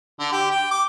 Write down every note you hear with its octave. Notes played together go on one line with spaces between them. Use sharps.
D3
G4
G5
D6